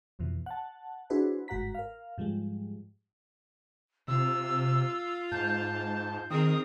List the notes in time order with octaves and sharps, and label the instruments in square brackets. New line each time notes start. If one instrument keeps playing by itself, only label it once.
[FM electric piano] B1 F2 B2 E3
F#5 A5
D4 E4 F#4 G#4 B4 C5
G1 G#2 F#4 F#5 A#5 B6
A#4 F5
G#2 F3 G3 G#3
[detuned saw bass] C3 [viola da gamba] F4 [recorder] E6
[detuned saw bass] G#2 [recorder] A5 [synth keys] G6
[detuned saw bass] D#3 [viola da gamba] C4 G#4 A#4 [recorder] D#6